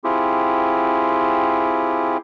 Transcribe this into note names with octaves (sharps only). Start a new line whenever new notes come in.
C4 E4 F4 G4 G#4